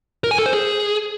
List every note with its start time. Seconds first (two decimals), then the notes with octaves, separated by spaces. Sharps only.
0.24 A#4
0.31 G#5
0.39 A4
0.46 C5
0.53 G#4